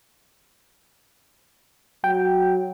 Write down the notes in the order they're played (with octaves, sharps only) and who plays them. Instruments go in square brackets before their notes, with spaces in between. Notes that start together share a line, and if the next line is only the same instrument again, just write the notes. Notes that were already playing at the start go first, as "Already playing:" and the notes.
[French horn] F#3 [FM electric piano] G5